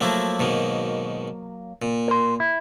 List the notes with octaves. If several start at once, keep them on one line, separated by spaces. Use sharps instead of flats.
F3 F#3 A3 A#3 E4
G#2 B2 D#3
A#2
A#4 C6
E4